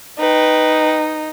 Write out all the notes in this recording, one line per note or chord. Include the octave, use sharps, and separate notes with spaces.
D#4 B4 G5